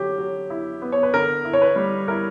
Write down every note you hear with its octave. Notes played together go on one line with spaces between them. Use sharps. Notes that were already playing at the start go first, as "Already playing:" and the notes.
Already playing: D3 F#3 E4 G4
F#3
E4
B3
C#5
B4
D3 A#4
E4
C#5
B4
G3
E4 A#4